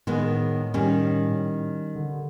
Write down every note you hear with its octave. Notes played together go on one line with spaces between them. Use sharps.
A2 D#3 G#3 B3
D#3 G3 C#4
D3